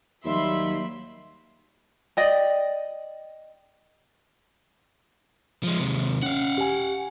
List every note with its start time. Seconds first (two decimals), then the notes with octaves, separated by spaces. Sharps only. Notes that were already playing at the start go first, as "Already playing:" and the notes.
0.24 D#2 F#3 G3 E5 B5 C6
2.17 D5 D#5 G5
5.63 F3 G#3
5.80 D#2 C3
6.22 C#4 F5 F#5
6.58 G4 G#5